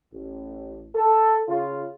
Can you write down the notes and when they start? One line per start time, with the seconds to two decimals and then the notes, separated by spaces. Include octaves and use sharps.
0.12 A1
0.95 A4
1.48 C#3 F4